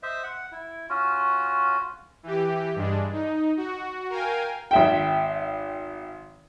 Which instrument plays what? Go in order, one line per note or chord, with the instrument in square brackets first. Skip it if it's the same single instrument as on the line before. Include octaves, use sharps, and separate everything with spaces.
[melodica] C5 D#5 E5
F#5
E4
C#4 F4 F#4
[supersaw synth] E3 G4
G2 G#3 D4
D#4
F#4
A#4 F5 G5 G#5
[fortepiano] G#1 E5 G5